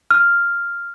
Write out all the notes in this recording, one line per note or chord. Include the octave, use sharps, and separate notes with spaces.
F6